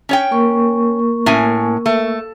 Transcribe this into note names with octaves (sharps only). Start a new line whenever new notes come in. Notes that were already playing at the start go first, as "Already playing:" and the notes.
C#4 C#5 G5
A#3 A#4 C#6
A2 C#4 G#5
A3